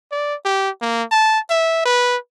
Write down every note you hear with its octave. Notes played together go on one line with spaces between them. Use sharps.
D5
G4
A#3
A5
E5
B4